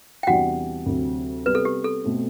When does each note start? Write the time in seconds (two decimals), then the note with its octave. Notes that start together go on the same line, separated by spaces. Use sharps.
0.23 G5
0.27 E2 C3 E3 G3 D4 F#4 F#5
0.86 D2 C3 F#3 C4
1.46 C3 G3 B3 B4
1.55 A4
1.65 G4
1.84 A4
2.04 B2 A3 C4